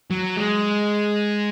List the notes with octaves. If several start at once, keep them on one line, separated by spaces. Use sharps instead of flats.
F#3
G#3